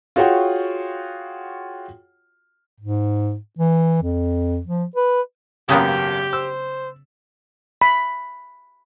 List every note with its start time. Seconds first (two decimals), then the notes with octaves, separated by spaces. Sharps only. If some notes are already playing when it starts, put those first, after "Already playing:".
0.16 F4 F#4 G#4 C#5 F#5 G5
2.80 G#2
3.58 E3
4.02 F2
4.67 F3
4.95 B4
5.69 G#1 F#2 C#3 F#3 A#3 B3 G4 G5
6.33 C5 E6
7.81 B5